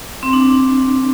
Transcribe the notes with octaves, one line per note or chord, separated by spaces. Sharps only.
C4
D4